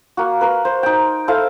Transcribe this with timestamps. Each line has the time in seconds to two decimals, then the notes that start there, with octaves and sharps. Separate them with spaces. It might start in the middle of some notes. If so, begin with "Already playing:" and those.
0.17 A#3 F#4
0.41 A#4 B4
0.65 C5
0.83 D#4 G5
1.28 E4 A4 C5 F5